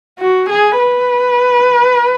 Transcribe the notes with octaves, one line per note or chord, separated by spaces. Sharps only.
F#4
G#4
B4